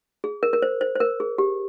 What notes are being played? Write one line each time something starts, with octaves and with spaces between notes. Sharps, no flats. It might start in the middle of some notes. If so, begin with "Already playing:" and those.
G#4
A#4
A#4
C5
C5
C5
A#4
G#4
G4